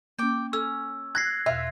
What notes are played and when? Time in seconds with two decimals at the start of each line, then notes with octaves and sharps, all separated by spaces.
0.19 A#3 C#4 G5 D6
0.53 C#4 A4 E6
1.15 F#6 G#6 A#6 C7
1.46 E2 B2 F4 E5